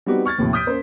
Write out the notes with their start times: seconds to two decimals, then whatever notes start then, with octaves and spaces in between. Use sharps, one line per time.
0.06 G3 B3 C4 D#4 F#4 G4
0.25 C#6 F6 G#6 A6
0.38 D#2 A2 C3 F3
0.53 D#6 F6 G6 B6 D7
0.67 A#3 C#4 C5